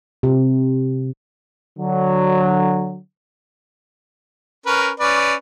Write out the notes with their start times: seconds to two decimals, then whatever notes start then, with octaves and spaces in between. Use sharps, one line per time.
0.23 C3
1.78 D3 F#3
4.66 C#4 A#4 B4
5.00 C#4 B4 D5